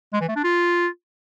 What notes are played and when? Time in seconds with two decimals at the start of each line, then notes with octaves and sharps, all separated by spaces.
0.13 G#3
0.21 E3
0.29 A3
0.36 D4
0.44 F4